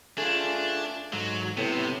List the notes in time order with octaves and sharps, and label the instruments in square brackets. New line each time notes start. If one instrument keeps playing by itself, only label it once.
[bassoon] A3 [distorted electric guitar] D4 [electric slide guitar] F4 G#4
[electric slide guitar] G#2 [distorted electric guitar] F#3
[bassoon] A2 [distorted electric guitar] C3 [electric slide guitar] B3